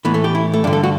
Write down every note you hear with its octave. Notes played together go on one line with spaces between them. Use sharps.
A2 E3 B3
A3
G4
E4
A3
G2 D3 D4
A4
F#4